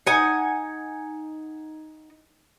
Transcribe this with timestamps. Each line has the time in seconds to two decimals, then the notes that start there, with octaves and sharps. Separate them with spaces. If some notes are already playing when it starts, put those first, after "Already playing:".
0.07 D#4 F#5 G#5